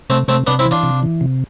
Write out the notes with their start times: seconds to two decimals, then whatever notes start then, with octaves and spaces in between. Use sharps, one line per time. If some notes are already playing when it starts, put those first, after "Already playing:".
0.09 C3 A3 C4
0.28 C3 A3 C4
0.47 C3 B3 D4
0.59 C4 E4
0.65 E3
0.71 D4 F4
0.83 C3
1.03 E3
1.21 C3